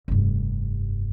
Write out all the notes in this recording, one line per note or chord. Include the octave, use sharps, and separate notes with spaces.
F1 G2